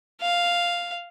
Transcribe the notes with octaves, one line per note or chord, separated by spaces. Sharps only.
F5